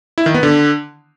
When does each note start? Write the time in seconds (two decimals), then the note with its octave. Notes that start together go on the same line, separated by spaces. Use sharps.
0.18 E4
0.26 D#3
0.34 B3
0.43 D3